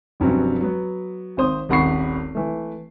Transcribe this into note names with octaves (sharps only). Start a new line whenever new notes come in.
F1 G2 F#3 C4 C#4
F#3 B3
G#1 C4 C5 D#6
D#1 G#1 F#5 B5 C#6 C7
E3 A3